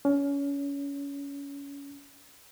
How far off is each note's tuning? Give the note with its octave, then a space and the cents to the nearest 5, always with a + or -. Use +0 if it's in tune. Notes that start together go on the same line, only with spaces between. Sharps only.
C#4 +25